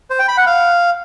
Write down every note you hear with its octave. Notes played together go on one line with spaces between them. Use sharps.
C5
G5
B5
F#5
F5